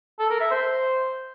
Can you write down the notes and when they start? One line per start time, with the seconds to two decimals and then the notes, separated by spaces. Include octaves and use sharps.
0.19 A4
0.30 A#4
0.41 E5
0.51 C5